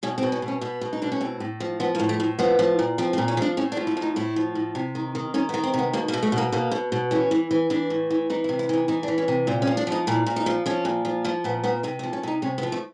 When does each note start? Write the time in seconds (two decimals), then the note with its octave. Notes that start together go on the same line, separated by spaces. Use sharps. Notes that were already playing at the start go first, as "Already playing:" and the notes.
0.03 B2 C#4
0.18 C4
0.23 B2
0.32 C#4
0.42 B2
0.48 C#4
0.61 B2 B3
0.81 B2
0.93 D#4
1.02 B2 D4
1.12 C#4
1.21 A2 C4
1.40 A2
1.60 F3
1.80 F3 B3
1.95 A#3
2.00 A2
2.09 A3
2.20 A2
2.39 F3 B3
2.59 F3
2.79 A#2
2.98 F3 C4
3.13 C4
3.18 A#2
3.28 C#4
3.37 F3 D4
3.57 A2 C#4
3.72 D4
3.77 F3
3.87 E4
3.97 A2
4.02 D#4
4.16 A2 E4
4.36 F3
4.55 A2
4.75 C3
4.95 D#3
5.15 D#3
5.34 D#3 C#4
5.49 B3
5.54 D#3
5.63 C4
5.74 C3 B3
5.93 B2 A#3
6.08 A#3
6.13 B2
6.23 A3
6.32 B2
6.38 A#3
6.52 B2 A#3
6.71 B2
6.92 B2
7.11 E3 C#4
7.31 E3
7.51 E3
7.70 E3 D4
7.90 A2
8.10 E3
8.30 E3 D#4
8.44 E4
8.49 C3
8.59 E4
8.69 E3 D#4
8.88 E3 D#4
9.03 D4
9.08 E3
9.18 C#4
9.28 C3
9.47 A#2 C4
9.62 C#4
9.67 F3
9.77 D4
9.87 F3 D#4
10.07 A#2 E4
10.26 A#2
10.36 D#4
10.46 F3
10.66 F3 C#4
10.85 A#2
11.05 F3
11.25 F3 A#3
11.44 A#2 B3
11.63 A#2 B3
11.83 C3 C4
11.99 C4
12.03 F3
12.13 C#4
12.23 C3 D#4
12.42 C3 C#4
12.58 B3
12.63 F3
12.72 A3